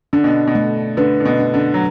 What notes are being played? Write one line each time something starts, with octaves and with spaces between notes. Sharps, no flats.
D3 D4
B2
B2
A3
D3 B4
D3
B2
D4
D3
F#3